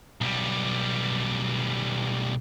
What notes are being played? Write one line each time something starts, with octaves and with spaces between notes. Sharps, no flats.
B1 G3